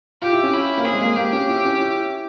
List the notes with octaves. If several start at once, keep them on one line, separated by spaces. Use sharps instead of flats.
F4 G4
E4
C#4
E4
A#3
C4 G#4
G#3
A#3
A#3 G4
C#4
E4
C#4
E4